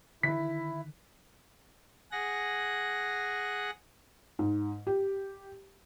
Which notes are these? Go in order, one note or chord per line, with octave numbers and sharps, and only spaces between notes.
D3 D#3 E4 B6
G#4 F#5 A#6
G#2
G4